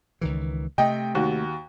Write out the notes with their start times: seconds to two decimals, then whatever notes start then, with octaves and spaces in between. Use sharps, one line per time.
0.21 C#2 D#3 E3
0.78 C3 A3 D#5 G5
1.15 D#2 F#4